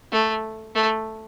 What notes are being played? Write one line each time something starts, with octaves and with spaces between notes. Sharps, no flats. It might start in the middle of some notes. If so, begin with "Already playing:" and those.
A3
A3